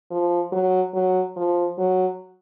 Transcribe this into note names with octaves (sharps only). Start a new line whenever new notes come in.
F3
F#3
F#3
F3
F#3